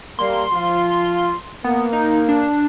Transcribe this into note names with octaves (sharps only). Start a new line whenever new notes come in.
G3 A#3 C6
F3 F4
A#3 B3
D#4
D4